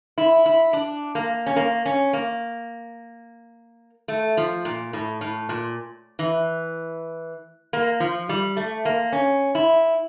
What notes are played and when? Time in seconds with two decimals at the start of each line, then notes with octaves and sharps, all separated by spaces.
0.18 E4
0.46 E4
0.73 D4
1.15 A#3
1.46 C#4
1.56 A#3
1.86 C#4
2.13 A#3
4.08 A3
4.37 F3
4.65 A#2
4.93 A2
5.21 A2
5.49 A#2
6.19 E3
7.73 A#3
8.00 F3
8.29 G3
8.57 A3
8.85 A#3
9.12 C#4
9.55 E4